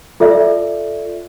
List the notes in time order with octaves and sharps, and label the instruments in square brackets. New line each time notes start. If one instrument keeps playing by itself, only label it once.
[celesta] F4 A4 D5 E5